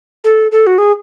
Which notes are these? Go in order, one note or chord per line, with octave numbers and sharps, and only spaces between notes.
A4
A4
F#4
G#4